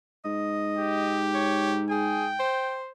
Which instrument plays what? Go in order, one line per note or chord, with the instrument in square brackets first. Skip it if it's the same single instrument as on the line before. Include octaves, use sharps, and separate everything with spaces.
[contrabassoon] G#2 [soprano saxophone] D#5
[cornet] G4
[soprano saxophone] C#5
[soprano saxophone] G#4 [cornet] G5
[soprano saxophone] C5